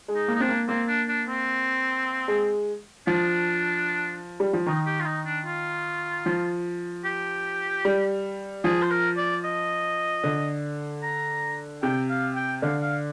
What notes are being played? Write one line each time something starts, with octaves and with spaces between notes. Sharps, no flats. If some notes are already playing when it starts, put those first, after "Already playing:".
G#3
D#4
A#3
D#4
C4 D4
A#3
A#3 C4
D4
D4
C4
G#3
F3 D4
G3
F3
D#3 D#4
G4
F4
D#4
D4
F4
F3
G4
G3
F3 G#4
C5
A#4
D5
D#5
D3
A#5
C3 G5
F5
G5
D3 F5
F5